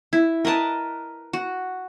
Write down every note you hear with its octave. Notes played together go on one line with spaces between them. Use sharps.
E4
A#4 B4 D#5 A5
F#4